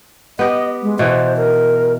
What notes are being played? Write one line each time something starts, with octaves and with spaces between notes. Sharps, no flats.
B3 G4 D#5
G#3
B2 E3 C5
A#4